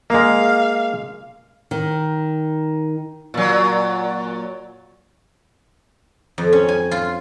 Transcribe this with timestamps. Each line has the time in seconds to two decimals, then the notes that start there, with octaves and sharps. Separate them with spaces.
0.10 G#3 A#3 F5
1.71 D#3
3.34 A#2 F#3
6.38 F2
6.53 C#4
6.69 G#5
6.91 F4